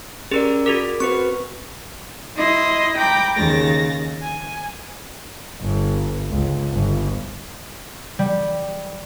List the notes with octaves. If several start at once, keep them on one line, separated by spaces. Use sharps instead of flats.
C#4 G4 G#4 A#4 D5
F#4 G#4 A#4 D6 B6
C4 F#4 B4 C#6 C#7
E4 D#5 C6
G5 A#5 B5 D6
D#2 C#3 A6 A#6
G#5
G1
C#2
G1
G3